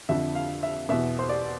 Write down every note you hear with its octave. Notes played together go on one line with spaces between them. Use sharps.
F2 D3 F3 E5
F5
E5
E2 B2 E5
C5
D5